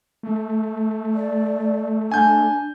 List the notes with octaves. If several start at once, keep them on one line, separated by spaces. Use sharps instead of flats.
A3
D5
D4 G#5 G6